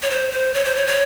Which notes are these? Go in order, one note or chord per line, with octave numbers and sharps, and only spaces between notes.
C#5
C5
C5
C#5
C5
C#5
C#5